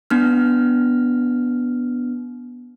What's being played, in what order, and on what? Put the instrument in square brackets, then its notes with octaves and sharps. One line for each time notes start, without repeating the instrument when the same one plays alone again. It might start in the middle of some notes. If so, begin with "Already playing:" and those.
[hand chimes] B3 D4 F6